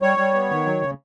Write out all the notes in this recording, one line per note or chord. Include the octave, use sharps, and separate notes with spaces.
G3 C#5
G3
B3
D#3
F#3
C#3